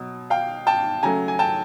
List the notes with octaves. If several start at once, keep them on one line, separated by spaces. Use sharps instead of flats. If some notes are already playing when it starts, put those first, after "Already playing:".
Already playing: B2 F#3
F5 G5
G5 A5
C#3 F#3 A3 G#5 A#5
G#5
G5 A5